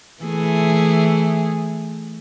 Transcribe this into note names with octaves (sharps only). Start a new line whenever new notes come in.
E3 A3 G#4